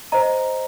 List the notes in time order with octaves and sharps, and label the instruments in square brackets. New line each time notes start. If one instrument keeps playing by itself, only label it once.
[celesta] C5 D#5 A#5